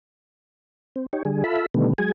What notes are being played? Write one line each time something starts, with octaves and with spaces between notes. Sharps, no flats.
C4
D#4 G4 C#5
D3 G3 G#4
F4 A4 E5 B5
B2 D3 D#3 G3 A3 B3
F#3 G#3 G#4 G#5